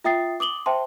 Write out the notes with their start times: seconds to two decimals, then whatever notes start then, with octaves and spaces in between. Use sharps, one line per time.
0.04 F4 E5 G5 D#6 A6 C7
0.40 D6 D#6 F#7 G7
0.66 C5 E5 G5 A5 C6